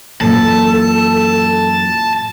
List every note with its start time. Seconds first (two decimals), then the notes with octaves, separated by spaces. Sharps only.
0.21 F#2 A#2 E3 A4 A5